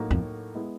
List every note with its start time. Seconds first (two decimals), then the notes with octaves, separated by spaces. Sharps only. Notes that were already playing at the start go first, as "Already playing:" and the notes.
Already playing: A2 F#3 A#3 D#4 F#4
0.11 F2
0.55 G#3 B3 E4